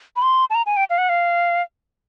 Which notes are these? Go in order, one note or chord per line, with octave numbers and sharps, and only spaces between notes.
B5
C6
A5
A#5
G#5
G5
F5
F#5
F5